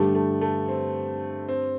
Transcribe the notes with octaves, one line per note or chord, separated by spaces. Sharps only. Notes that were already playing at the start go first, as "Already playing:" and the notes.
Already playing: G2 D3 G3 A3 D4 G4
A3
A3
C4
C4